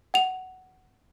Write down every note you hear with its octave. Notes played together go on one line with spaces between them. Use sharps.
F#5 F7